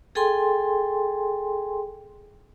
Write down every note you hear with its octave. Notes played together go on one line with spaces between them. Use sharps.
G#4 A4 G5 G#5 C6